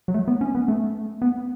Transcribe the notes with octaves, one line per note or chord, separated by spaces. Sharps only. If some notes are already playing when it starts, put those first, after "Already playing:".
F#3
A3
B3
C#4
B3
A3
B3